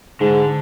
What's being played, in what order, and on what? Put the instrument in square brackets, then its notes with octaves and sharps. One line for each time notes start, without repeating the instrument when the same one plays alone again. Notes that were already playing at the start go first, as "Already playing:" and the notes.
[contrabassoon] G#2 [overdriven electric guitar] D3